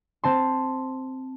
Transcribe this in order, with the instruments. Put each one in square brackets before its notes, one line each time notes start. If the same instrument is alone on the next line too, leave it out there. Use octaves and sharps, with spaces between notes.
[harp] C4 A5 C6